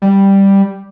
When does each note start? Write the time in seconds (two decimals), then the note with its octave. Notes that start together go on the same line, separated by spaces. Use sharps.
0.02 G3